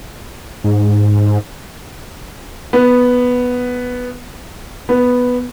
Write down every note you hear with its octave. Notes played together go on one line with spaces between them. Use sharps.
G#2
B3
B3